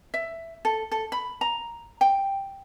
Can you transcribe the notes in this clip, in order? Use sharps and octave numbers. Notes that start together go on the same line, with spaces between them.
E5
A4
A4
B5
A#5
G5